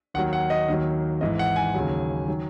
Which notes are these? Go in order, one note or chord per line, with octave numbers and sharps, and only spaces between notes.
D#2 D#3 F#3 F#5
F#5
D#5
D#2 D#3 F#3
G#1 G#2 E3 D#5
F#5
G#5
D#2 C#3 F#3
D#3 F#3